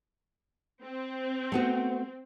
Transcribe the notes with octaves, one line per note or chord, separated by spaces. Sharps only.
C4
A3 B3 F#4